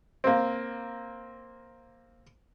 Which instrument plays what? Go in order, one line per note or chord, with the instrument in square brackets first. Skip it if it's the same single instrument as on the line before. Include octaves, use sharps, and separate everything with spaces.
[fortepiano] A#3 C4